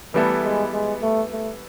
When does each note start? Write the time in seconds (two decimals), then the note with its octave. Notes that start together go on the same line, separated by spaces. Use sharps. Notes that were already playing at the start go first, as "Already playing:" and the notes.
0.14 E3 G3 A3 B3 E4 A4
0.43 G#3
0.73 G#3
1.02 A3
1.31 A3